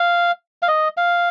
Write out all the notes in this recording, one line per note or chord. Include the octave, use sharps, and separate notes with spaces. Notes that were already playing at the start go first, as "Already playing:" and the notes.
Already playing: F5
F5
D#5
F5